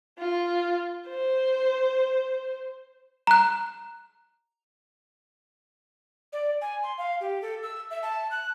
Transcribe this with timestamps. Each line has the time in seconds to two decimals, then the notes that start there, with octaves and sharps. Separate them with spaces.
0.19 F4
1.08 C5
3.27 A#5 F#6
6.33 D5
6.61 G#5
6.83 C6
6.98 F5
7.21 G4
7.42 A4
7.63 E6
7.91 E5
8.03 A5
8.31 F#6